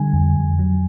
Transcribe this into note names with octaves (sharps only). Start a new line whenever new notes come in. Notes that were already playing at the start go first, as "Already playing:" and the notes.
Already playing: D3 G3 G#5
F2
F2
F#3